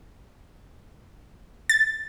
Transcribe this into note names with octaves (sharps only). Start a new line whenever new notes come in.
A6